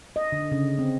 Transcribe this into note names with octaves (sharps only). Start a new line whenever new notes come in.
D#5
D3
C#3
C4